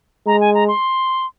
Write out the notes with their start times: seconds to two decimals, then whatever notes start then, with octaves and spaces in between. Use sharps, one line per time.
0.27 G#3 A#5
0.40 G#5
0.54 A#5
0.68 C6